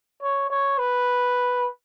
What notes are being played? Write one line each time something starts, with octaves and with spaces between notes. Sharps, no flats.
C#5
C#5
B4